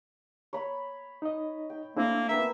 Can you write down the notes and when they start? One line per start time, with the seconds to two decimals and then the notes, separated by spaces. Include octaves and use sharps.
0.53 C#5 B5
1.22 D#4 D#5
1.70 G5
1.97 A3 A#3 C4 D4 E4
2.29 A#3 B3 E5 G5